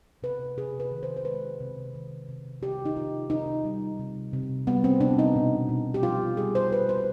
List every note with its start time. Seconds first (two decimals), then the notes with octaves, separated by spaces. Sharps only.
0.23 C3 B4
0.57 C3 G#4
0.80 B4
0.91 D#3
1.03 C5
1.17 C5
1.25 G#3 B4
1.60 C3
1.94 D#3
2.28 C3
2.62 C3 G4
2.85 D#4
2.96 C3 F4
3.30 C3 D#4
3.65 G3
3.99 C3
4.33 C3
4.67 G3 B3
4.84 C4
5.01 C3 D4
5.19 D#4
5.36 B2
5.69 B2
5.94 G4
6.03 G3 F4
6.37 G3 G#4
6.55 C5
6.71 G3 B4
6.89 C5